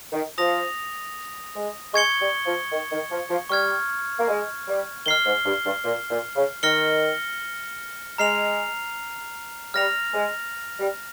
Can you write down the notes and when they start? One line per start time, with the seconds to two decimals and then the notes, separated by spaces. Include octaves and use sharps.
0.12 D#3
0.38 F3 D#6 A#6 F7
1.55 G#3
1.94 G#3 C#6 G#6 C#7 G7
2.21 G3
2.46 F3
2.72 D#3
2.91 D#3
3.11 F3
3.30 F3
3.49 G3 C#6 F6 G#6
4.19 A#3
4.28 G#3
4.68 G3
5.06 D#3 F6 C7 G7
5.26 G#2
5.45 G2
5.65 G2
5.84 A#2
6.10 A#2
6.36 C#3
6.63 D#3 F6 A#6 C#7 G7
8.18 G#3 A#5 F6 C7 F7
9.74 G3 F6 A#6 F7
10.13 G#3
10.79 G3